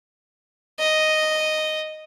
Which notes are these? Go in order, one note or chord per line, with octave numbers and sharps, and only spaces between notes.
D#5